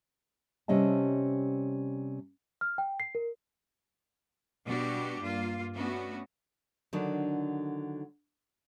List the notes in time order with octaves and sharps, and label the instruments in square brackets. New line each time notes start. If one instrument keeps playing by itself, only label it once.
[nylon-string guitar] C3 G3 C#4 D#5 E5 A5
[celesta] F6
G5
C7
A#4
[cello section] B2 G3 B3 D4 F#4 G4
G2 A#3 F4
A3 B3 C#4 D4 F#4
[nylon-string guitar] D3 D#3 F#3 D4